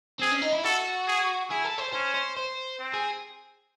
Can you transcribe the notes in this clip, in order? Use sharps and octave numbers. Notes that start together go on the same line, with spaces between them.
C4 G#4
C#4
D#4
E4
F#4 A4
G#4
E4 G#4
A4
C5
C#4 C5
C5
C5
C4
G#4